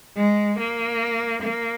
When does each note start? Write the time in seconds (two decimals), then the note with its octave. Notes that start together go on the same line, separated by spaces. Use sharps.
0.16 G#3
0.58 A#3
1.42 A#3